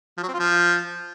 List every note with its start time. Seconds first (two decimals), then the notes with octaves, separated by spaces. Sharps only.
0.17 F3
0.23 F#3
0.28 C4
0.34 F4
0.39 F3